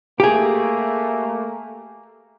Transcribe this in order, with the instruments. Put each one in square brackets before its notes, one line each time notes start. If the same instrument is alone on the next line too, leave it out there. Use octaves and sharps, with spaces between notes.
[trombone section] A3 A#3 [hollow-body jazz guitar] G4 G#4